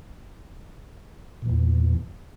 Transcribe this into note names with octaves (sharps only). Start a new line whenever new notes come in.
E2 A#2 E3